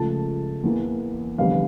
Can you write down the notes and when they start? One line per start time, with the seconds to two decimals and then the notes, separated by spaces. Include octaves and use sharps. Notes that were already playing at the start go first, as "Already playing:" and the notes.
Already playing: C#2 C#3 F3 A3 A5
0.64 E2 E3 A#3
1.38 F1 E2 D3 G3 F5